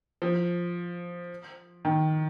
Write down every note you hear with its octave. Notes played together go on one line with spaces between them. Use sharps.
F3
D#3